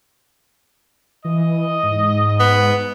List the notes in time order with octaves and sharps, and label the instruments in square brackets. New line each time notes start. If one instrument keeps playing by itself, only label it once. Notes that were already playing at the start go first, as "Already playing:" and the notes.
[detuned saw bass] E3 [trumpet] D#5
[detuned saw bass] G#2
[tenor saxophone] B3